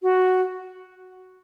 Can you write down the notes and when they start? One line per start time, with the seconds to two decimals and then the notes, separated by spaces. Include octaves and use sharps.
0.02 F#4